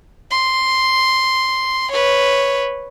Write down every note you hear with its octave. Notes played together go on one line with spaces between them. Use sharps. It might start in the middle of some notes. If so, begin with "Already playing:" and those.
C6
B4 C#5